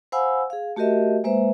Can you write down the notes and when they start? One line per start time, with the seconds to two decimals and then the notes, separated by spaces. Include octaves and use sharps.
0.12 C5 F5 F#5 G#5 B5 E6
0.50 G#4 F5
0.76 A3 F#4 G4 A#4 D#5 E5
1.24 G#3 A#3 B4 C5 E5